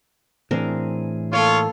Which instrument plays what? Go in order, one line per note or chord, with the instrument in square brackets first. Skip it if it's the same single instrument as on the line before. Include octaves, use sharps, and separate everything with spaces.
[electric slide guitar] A2 E3 G#4 [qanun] C4 D4 A#4
[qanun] A#3 [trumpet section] F4 C#5 [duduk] A4